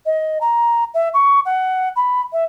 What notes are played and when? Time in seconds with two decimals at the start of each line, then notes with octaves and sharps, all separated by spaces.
0.05 D#5
0.40 A#5
0.94 E5
1.13 C#6
1.45 F#5
1.95 B5
2.32 E5